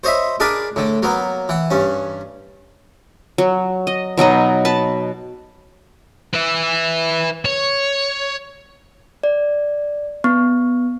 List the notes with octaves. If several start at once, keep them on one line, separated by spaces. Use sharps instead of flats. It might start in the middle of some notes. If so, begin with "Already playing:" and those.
C5 C#5 D#5 E5 B5
D4 G#4 A#4 D5 G#5 B5
A2 D3
F#3 A#3 B3
E3 F#5
G2 C#4
F#3
D#5
B2 F#3 D#4 D#5
B4 A5
B4 E5
C#5
D5
B3